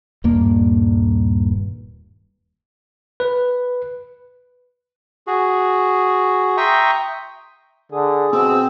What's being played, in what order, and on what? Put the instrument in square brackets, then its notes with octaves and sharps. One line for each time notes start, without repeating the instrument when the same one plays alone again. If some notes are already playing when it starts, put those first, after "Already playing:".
[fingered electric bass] D#1 G2 A#3
[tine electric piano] B4
[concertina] F#4 G#4
E5 G5 A#5 C6 C#6 D#6
[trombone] D3 [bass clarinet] G#4
[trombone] B2 [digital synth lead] C4 [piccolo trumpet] E6